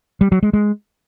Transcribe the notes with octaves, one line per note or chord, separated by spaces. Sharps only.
G3
F#3
G#3
G#3